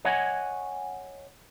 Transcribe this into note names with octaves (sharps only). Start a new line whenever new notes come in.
C#5 D#5 F#5 G#5